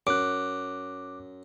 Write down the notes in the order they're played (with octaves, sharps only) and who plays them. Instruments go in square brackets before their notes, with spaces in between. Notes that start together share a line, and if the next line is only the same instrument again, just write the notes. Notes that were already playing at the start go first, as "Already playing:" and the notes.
[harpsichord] F#2 [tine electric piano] D6 F#6